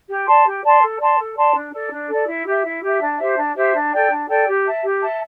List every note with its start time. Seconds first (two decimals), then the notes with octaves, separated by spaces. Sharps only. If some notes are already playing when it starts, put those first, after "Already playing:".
0.09 G4
0.26 D5 A5 C6
0.45 G4
0.62 D5 A5 C6
0.81 A4
1.00 D5 A5 C6
1.18 A4
1.36 D5 A5 C6
1.54 D4
1.72 A4 D5
1.90 D4
2.08 A4 D5
2.27 E4
2.45 G4 E5
2.64 E4
2.82 G4 E5
3.01 D4
3.18 G4 C5 E5
3.37 D4
3.55 G4 C5 E5
3.73 D4
3.92 A4 D5 G5
4.10 D4
4.28 A4 D5 G5
4.47 G4
4.64 E5 A5
4.83 G4
5.01 E5 A5